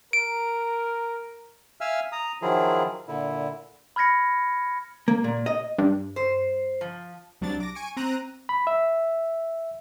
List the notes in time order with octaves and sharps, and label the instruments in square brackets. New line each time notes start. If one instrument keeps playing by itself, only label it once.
[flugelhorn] A#4 [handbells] D7
[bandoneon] E5 F5 G#5 E6 F6
A#5 D#6
D#3 F3 F#3 E4 F4 G#4
A#2 D3 E4
[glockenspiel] B5 F6 G#6 A#6 C#7
[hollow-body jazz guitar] A#3
A#2
D#5
[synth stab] G2
[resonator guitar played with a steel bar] C5
F3
[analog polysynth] C2 F#3 D4 A6
D6 A#6
G#5 C#6 D7
C4 A#5 F#6 D#7
[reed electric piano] B5
E5